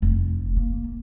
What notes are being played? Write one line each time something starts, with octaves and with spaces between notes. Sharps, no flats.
F1
A#3